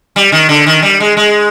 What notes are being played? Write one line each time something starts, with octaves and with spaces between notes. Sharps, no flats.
G3
D#3
D3
D#3
G3
G#3
G#3